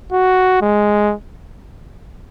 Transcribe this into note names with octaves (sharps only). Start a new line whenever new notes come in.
F#4
G#3